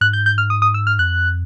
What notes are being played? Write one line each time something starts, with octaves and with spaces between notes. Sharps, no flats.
G#2 F#6
G6
G6
F6
D#6
D#6
E6
F6
F2 F#6